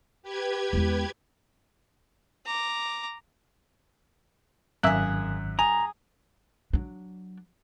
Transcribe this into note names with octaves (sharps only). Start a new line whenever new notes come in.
G4 B4 G#6
E2 G#3
A#5 D6
G#1 F#2 A#3 G#4 E5 F#6
G#4 A#5
F#3 D4